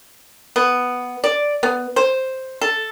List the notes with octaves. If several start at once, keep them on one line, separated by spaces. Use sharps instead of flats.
B3
D5
B3
C5
A4